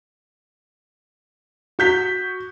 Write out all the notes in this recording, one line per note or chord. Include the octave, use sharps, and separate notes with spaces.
F#4 G6 B6